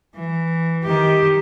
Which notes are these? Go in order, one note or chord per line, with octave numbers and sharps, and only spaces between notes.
E3
D#3 G4